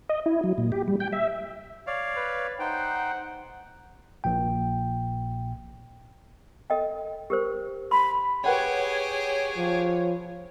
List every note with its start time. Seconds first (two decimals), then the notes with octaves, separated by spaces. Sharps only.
0.09 D#5
0.26 E4
0.44 F#3
0.58 A#2
0.72 G4
0.88 G3
1.00 G5
1.13 E5
1.87 C#5 D5 F5
2.16 B4
2.59 D#4 C5 F#5 G5
4.24 A#1 A#2 G5
6.70 A4 D#5 G5
7.30 G4 A#4 C5
7.91 B5 C6
8.44 G4 G#4 B4 C#5 F#5 G5
9.57 F3